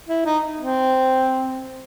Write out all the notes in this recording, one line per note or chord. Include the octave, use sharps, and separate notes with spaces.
E4
D#4
C4